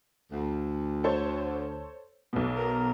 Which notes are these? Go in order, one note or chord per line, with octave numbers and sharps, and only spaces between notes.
D2
A4 C5 C#5
B1 B2
A#4